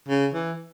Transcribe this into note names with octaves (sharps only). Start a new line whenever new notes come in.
C#3
E3